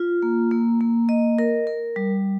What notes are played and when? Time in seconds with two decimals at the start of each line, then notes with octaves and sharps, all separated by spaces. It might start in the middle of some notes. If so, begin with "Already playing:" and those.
Already playing: F4
0.22 A#3
0.51 A#3
0.81 A#3
1.09 D#5
1.39 A#4
1.67 A#4
1.96 G3